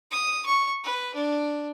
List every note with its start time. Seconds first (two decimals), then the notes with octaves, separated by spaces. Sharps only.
0.11 D#6
0.46 C#6
0.84 B4
1.15 D4